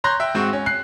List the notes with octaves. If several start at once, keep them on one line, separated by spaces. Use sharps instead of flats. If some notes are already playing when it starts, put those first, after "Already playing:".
C#5 A#5 C6 F#6 G6 A#6
E5 G5
G#2 C4 F#4 C#6
C#4
F#6 C7